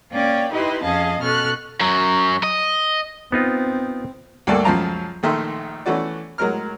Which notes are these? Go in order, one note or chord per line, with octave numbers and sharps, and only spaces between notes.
A#3 C#4 C#5 D5 F5 G5
D#4 E4 G4 B4 D#5 C6
F2 C#4 G#4 D#5 F5 A5
B2 C#4 A4 C#6 F6 F#6
F#2 F#3
D#5
B3 C4 D#4 F4
D2 G2 A#3 A4 D5 F#5
C#2 F#2 F3 F4 A5 A#5
A#1 D#3 A3 E5 C6
E3 A3 C#4 F#4 D5
A2 F#3 G#3 A#4 F6